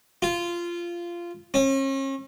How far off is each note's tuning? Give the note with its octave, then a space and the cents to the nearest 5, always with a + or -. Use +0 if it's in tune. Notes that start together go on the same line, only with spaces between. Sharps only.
F4 -15
C#4 -40